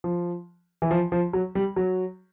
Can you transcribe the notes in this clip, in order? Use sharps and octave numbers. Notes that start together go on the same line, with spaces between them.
F3
E3
F3
F3
F#3
G3
F#3